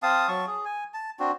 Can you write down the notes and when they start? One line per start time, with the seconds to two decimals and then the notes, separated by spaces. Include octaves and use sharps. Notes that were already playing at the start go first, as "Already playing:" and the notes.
0.03 C4 F5 A5 D#6
0.28 F#3 A5 C#6
0.47 G#4
0.65 G#5
0.94 A5
1.20 C4 D4 F#4